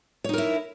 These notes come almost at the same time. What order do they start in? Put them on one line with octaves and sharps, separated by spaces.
C#5 D#4 A#4 E4